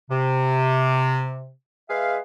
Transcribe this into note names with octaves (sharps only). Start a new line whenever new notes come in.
C3
G#3 G#4 B4 E5 F5